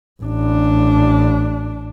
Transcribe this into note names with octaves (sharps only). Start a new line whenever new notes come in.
A1 D4